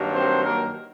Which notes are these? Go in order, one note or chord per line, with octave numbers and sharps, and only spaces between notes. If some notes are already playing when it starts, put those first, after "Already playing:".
Already playing: G2 D#3 F#3 A#3
C4 C5
A#3 A#4